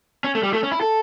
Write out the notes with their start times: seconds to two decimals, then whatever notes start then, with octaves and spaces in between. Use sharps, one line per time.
0.24 C#4
0.35 A3
0.43 G3
0.53 A3
0.63 C#4
0.72 E4
0.81 A4